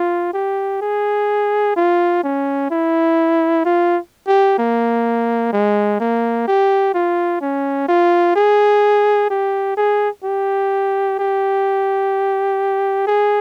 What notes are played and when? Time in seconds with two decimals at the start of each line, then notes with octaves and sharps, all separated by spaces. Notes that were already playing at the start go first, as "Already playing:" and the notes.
Already playing: F4
0.34 G4
0.81 G#4
1.76 F4
2.23 C#4
2.70 E4
3.65 F4
4.27 G4
4.58 A#3
5.53 G#3
6.00 A#3
6.48 G4
6.94 F4
7.41 C#4
7.88 F4
8.36 G#4
9.30 G4
9.77 G#4
10.24 G4
11.19 G4
13.07 G#4